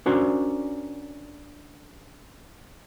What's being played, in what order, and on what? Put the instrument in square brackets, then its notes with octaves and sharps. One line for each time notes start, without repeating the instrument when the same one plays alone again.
[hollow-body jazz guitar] C#4 D4 F#4 A#4 C5 D5